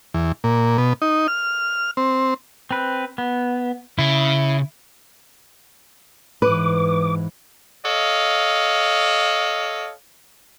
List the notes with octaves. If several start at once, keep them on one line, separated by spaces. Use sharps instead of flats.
E2
A#2
B2
D#4
F6
C4
C4 B4
B3
C#3 E4
G#2 E3 B4 D6
A4 C#5 D#5 F5